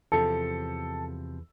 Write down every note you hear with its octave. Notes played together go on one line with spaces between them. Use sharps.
E2 C3 F3 A4